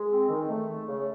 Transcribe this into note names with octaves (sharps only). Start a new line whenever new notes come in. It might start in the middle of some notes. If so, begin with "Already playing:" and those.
Already playing: G#3
C4
D#3
A3
A3
C#3